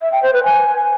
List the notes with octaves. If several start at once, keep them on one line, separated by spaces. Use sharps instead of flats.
E5
G5
C5
B4
G#5